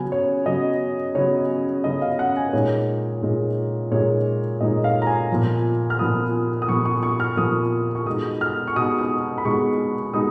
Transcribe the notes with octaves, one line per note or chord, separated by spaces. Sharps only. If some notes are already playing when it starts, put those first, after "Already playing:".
Already playing: C#3 F#3 B3 G#5
C#5
C#3 F#3 B3 D#5
C#3 F#3 B3 C#5
C#3 F#3 B3 D#5
F5
F#5
G#5
B4
A#2 G#3 D#4 C#5
A#2 G#3 D#4
A#2 G#3 D#4 C#5
A#2 G#3 D#4 D#5
F5
A#5
G#5
A#2 F3 B3
F6
A#2 F3 B3 D#6
D#6
A#2 F3 B3 C#6
C#6
C#6
F6
A#2 F3 B3 D#6
C#6
B2 G#3 B3 D#4 D#6
F6
C#6
B2 G#3 B3 D#4 D#6
D#6
B5
B2 G#3 B3 D#4 C#6
B2 G#3 B3 D#4 D#6